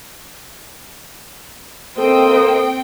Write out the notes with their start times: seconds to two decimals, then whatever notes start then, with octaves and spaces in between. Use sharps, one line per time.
1.98 A#3 C4 A4 C5 D#5 G5